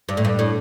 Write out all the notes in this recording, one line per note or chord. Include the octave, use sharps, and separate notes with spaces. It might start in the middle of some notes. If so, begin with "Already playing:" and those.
G2
A2
G2
A2